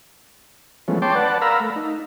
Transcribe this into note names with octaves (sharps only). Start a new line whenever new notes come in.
E3 F3 G#3 A3 B3 C#4
C#5 G5 A5 C6 D6
B4 D5 F#5 A5
A#4 F5 A#5 B5 E6
A3
D#4